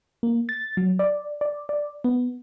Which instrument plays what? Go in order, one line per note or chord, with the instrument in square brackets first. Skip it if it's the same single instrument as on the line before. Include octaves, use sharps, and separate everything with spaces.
[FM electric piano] A#3
A6
F#3
D5
D5
D5
B3